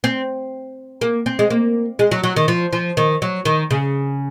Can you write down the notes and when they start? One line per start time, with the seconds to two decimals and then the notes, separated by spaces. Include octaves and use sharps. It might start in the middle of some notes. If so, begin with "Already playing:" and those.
0.04 C4
1.01 A#3
1.26 C4
1.39 G#3
1.50 A#3
1.99 G#3
2.11 F#3
2.23 F#3
2.36 D#3
2.48 F3
2.73 F3
2.97 D#3
3.22 F#3
3.45 D#3
3.71 C#3